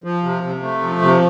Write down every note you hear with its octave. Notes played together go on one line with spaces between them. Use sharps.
F3
C3
C3
A3
F3
C3